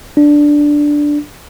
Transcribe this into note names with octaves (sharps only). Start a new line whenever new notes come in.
D4